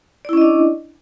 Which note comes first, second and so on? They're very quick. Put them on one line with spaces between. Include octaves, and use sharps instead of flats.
D5 E4 C#4 D#5 D4